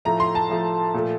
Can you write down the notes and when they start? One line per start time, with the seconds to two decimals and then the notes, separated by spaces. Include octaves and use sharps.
0.05 A2 F3 A3 A#5
0.20 C6
0.35 A5
0.49 A2 F3 A3
0.94 A#2 F3 A3